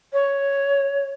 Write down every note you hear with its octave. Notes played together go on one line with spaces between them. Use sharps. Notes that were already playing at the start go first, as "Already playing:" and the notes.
C#5